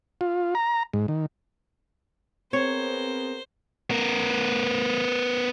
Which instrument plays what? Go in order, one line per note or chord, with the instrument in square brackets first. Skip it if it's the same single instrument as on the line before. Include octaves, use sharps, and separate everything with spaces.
[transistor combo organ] F4
A#5
G#2
D#3
[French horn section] B3 G#4 A#4 [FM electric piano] C4 [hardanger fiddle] C5 [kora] C#5
[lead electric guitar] B3 A#4